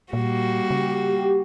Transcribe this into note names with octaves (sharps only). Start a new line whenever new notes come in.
A#2 G3 A#3 F#4
C#3 G4